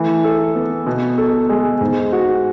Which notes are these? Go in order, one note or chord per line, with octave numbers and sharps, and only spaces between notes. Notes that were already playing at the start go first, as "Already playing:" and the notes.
Already playing: E3 A3
A4
B3
B2
A4
G#3
G#2
F#4